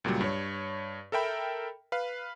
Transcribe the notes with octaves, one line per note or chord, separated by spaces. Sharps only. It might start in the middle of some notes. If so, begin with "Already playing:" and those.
C#2 A#2 F#3 G3
G2 C#5
A4 A#4 E5 G5 B5
B4 F5